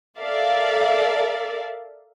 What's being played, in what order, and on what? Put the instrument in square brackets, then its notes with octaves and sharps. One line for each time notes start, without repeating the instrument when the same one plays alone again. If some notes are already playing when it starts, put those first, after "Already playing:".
[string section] A4 A#4 D5 E5 F5